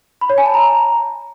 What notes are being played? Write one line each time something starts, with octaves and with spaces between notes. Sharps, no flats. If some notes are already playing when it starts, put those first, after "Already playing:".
B5
C#5
G#5
A5
A#5